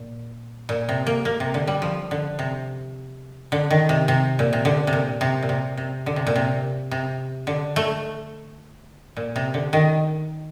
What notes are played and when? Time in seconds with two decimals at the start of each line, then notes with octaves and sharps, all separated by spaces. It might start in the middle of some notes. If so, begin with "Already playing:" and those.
Already playing: A#2
0.69 A#2
0.89 C3
1.07 A#3
1.25 A#3
1.40 C3
1.54 D3
1.67 G3
1.82 F3
2.11 D3
2.39 C3
3.52 D3
3.71 D#3
3.89 C3
4.08 C3
4.39 A#2
4.53 C3
4.65 D3
4.87 C3
4.93 A#2
5.21 C3
5.43 A#2
5.49 C3
5.77 C3
6.06 D3
6.16 C3
6.27 A#2
6.36 C3
6.91 C3
7.47 D3
7.76 A3
9.17 A#2
9.36 C3
9.54 D3
9.73 D#3